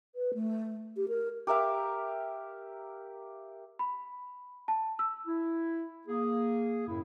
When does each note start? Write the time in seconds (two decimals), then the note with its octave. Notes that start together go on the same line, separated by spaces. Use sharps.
0.15 B4
0.34 A3
0.97 G4
1.08 A#4
1.47 G4 A#4 E5 F5
3.79 B5
4.68 A5
4.99 E6
5.26 E4
6.08 A#3 G#4
6.87 F#2 A2 C#3 E4